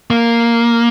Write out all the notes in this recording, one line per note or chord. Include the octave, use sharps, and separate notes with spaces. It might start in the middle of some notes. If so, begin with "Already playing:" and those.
A#3